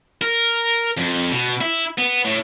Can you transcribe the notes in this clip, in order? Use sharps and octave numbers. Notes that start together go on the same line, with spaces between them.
A#4
F2
B2
E4
B3
A2